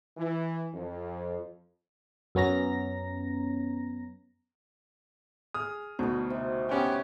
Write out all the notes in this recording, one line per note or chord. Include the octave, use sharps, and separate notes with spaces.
E3
F2
F#2 B3 C#4 A#5 A#6
G#4 D#6 F6
D2 B2 C4 D#4 A5 B5
C3
B3 C#4 G4 G5